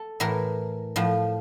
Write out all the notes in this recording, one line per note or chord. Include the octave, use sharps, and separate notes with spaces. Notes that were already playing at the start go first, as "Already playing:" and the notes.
Already playing: A4
A2 E3 A#4
A2 F3